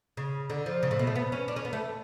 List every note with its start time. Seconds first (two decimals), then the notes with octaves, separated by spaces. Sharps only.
0.17 C#3
0.50 D3
0.66 F3
0.83 C#3
0.91 A2
0.99 B2
1.07 A3
1.15 B3
1.32 C#4
1.48 D4
1.56 C#4
1.65 B3
1.73 A3